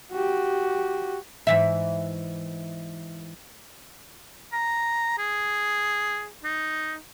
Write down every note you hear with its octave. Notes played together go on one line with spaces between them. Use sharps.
F#4 G4
G#2 E3 E5
A#5
G#4
D#4